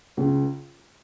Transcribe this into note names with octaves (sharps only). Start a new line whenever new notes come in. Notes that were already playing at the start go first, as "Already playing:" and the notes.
C#2 C#3